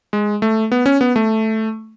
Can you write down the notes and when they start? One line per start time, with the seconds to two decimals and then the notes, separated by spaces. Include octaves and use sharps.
0.13 G#3
0.42 A3
0.72 B3
0.86 C#4
1.01 B3
1.16 A3